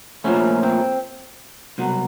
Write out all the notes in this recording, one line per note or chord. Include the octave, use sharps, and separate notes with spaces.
A#2 F3 A3 C#4
C4
C2 B2 F#3